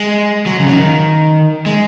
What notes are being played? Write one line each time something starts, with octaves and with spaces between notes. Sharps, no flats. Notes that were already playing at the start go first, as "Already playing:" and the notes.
Already playing: G#3
F#3
C#3
F#3
D#3
G#3